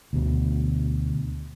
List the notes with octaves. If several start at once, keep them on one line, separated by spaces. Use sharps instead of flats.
D2 B2